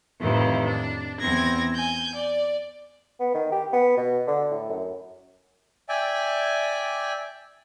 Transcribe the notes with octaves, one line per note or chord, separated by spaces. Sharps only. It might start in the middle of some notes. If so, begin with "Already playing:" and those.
F2 A2 C3 D#3 E3
D4
E2 C4 G#6 A#6
G#5 G6
D5
B3
D#3
G4
B3
B2
D3
A2
F#2
D5 E5 G5 G#5